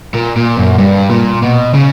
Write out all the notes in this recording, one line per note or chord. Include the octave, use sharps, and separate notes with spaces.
A#2
A#2
F#2
G2
A#2
B2
C#3